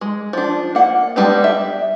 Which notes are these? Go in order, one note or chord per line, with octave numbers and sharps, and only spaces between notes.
G#3
F3 D4
A#3 F#5
G3 G#3 B3 D4 G4
E5